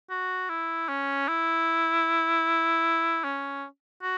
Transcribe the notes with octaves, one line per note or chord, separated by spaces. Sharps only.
F#4
E4
C#4
E4
C#4
F#4